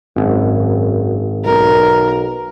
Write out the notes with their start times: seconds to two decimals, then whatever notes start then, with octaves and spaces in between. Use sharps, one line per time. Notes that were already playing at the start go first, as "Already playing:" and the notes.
0.16 G#1 F#2
1.45 B1 A#4